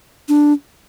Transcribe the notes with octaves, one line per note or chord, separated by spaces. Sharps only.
D4